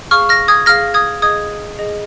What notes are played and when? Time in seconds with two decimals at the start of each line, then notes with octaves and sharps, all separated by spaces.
0.11 G#4 F5 C#6 F6
0.29 F6 A#6
0.48 D#6 G#6
0.66 G#4 F5 F6 A#6
0.94 D#6 G#6
1.22 G#4 D#5 D#6 G#6
1.79 G#4 D#5